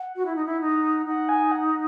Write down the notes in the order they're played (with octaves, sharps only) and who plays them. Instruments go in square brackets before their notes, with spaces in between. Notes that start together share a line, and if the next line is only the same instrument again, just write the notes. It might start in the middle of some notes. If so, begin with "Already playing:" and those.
Already playing: [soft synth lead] F#5
[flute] F#4
E4
D#4
E4
D#4
[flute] D#4 [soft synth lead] F#5
[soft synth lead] G#5
F#5